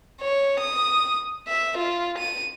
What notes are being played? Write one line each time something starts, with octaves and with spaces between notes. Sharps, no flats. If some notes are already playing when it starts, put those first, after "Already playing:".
C#5
D#6
E5
F4
D#7